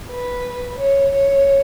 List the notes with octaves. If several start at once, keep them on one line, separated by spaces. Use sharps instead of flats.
B4
C#5
C#5